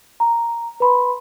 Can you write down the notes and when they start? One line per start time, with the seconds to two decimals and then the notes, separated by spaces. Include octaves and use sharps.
0.20 A#5
0.80 B4 B5 C6